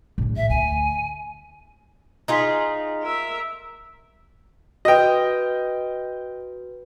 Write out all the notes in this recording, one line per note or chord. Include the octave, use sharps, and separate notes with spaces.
A#1 A2
E5
D2 G#5
D#4 F4 G#4 A#5 C6 B6
A#4 E5
F#4 B4 D#5 G5